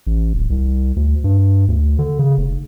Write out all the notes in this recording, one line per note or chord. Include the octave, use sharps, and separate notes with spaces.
A1
D1
C2
D2
G2
D2
D3
C#3
F1